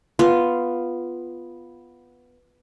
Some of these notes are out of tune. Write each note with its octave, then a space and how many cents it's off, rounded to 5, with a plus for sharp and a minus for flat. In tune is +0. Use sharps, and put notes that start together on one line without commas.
B3 +0 F4 -5 F5 +0